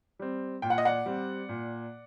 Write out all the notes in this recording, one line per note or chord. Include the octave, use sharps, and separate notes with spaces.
G3 C4
A#2 G5
F#5
D#5
D5 F#5
G3 C4
A#2